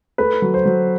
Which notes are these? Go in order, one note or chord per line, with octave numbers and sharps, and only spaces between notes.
A3 B4
F#3
C5
F#3